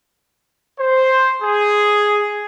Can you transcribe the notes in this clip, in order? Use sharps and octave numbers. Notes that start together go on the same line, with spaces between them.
C5
G#4